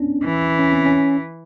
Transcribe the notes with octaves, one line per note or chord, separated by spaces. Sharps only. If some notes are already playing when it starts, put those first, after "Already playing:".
Already playing: B3 C#4 D4
E3
C#4
C4
C#4